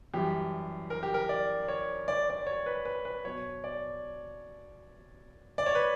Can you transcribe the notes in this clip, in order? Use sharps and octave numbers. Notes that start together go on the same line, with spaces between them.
F#2 E3 G3 G4
A#4
G4
A#4
D5
C#5
D5
D5
C#5
B4
B4
B4
B2 F#3 C#5
D5
D5
C#5
B4